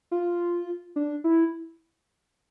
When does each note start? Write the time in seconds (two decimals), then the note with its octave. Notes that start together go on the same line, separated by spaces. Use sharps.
0.11 F4
0.96 D4
1.24 E4